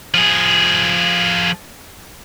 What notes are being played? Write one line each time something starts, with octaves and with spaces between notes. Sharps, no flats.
F3 G#4